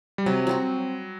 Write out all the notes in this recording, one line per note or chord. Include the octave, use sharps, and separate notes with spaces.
G3
C3 F#3
F#3 C4 F#4